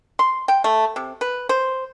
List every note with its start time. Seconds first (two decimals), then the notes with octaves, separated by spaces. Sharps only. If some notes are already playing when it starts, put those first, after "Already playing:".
0.19 C6
0.48 G5
0.64 A3
0.96 C3
1.21 B4
1.49 C5